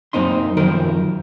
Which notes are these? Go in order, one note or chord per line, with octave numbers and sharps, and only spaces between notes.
F#2 A#3 C4 D#4 C6
F#2 D#3 F3 A#4